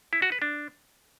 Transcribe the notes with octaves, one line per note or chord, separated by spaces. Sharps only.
E4
F#4
B4
D4